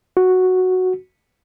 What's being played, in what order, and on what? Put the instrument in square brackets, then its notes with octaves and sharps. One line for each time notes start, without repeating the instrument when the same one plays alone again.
[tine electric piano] F#4